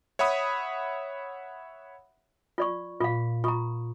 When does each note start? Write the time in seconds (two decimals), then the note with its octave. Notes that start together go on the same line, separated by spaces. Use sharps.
0.19 C#5 E5 F#5 B5 D#6
2.58 F4 D5 C#6
3.01 A#2 F4 F5
3.44 F4 A#5 C#6 D#6